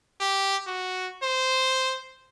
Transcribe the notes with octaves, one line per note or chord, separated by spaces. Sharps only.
G4
F#4
C5